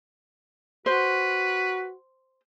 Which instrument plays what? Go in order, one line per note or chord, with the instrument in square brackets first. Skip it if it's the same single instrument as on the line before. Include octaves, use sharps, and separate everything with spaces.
[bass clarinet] F#4 [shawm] B4 [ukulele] C5